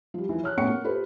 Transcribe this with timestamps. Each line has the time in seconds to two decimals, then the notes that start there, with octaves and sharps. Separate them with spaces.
0.14 F3 G3
0.29 E3 F3
0.43 C#5 F6 F#6
0.57 A2 B3 C#4 F#5 C#6 C#7
0.70 A#3
0.84 F4 G4 A4 B4 C5